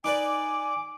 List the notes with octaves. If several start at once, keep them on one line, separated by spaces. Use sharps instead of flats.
D#4 B4 D5 G#5 D6